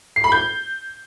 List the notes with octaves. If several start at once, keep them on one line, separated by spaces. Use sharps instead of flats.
C7
B5
G6